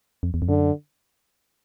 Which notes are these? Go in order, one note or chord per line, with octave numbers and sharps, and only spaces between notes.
F2
E2
F2
F#2 D3